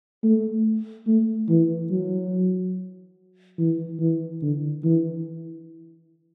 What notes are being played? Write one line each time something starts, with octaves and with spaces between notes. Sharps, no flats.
A3
A3
E3
F#3
E3
E3
D3
E3